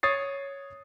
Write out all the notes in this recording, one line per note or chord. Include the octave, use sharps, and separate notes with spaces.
C#5 D#6 A6 C7